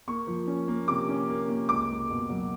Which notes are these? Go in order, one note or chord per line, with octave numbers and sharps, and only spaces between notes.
A#3 C#6
F3
C#4
A#3
C3 D6
C#4
A#3
A#3
C#2 D6
C#2
B2
F#3